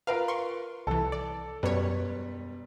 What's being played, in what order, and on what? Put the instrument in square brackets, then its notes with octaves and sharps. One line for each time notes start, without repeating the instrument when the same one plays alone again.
[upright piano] F4 A#4 B4 [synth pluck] F5
[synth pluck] C6 C#6
[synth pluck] C2 E3 [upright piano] A4
[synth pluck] D5
[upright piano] E1 G3 B4 [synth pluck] F#2 C#5